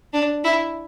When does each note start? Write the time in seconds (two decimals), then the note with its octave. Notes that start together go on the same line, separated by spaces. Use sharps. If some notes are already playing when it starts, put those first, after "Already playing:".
0.13 D4
0.44 E4